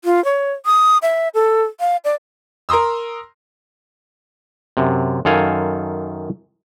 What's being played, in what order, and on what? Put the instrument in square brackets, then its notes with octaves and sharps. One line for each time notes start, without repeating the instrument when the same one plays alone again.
[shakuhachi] F4
C#5
D#6
E5
A4
F5
D5
[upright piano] A#4 A#5 C6 D#6 E6
[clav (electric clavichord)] F#2 C3
F#2 D#3 A4 F5 G#5